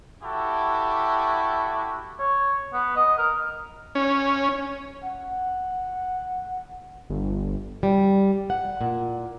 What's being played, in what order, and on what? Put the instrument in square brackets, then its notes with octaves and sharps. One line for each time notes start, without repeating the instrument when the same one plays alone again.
[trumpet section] E4 F#4 G4 A4
[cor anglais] C#5
B3
D#5
A#4
[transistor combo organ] C#4
[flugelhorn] F#5
[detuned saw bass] G1
[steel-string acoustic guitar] G3
F#5
A#2